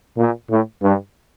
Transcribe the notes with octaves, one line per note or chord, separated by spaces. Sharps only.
A#2
A2
G2